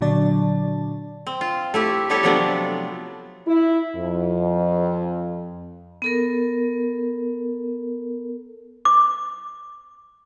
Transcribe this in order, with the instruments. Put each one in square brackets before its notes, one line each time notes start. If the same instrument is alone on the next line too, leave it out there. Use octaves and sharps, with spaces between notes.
[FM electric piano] A#2 D3 F#3 D4 D5 A5
[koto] C4
F4
A3 E4 G4
G3 B3 E4 G4 A4 C#5
C3 F3 F#3 A3 B3 D4
[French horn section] E4
F2
[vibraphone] B3 A4 A#4
[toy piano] D6